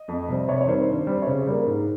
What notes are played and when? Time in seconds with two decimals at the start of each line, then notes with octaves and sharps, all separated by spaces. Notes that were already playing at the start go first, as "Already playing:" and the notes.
Already playing: D#5
0.08 F2
0.28 C3 G3 C4
0.48 C3 C#5
0.61 C#5
0.68 D#3 G3 C4 C5
0.87 G2
1.07 G3 C4
1.22 C#5
1.27 C#3 C5
1.47 G3 A#3
1.66 G#2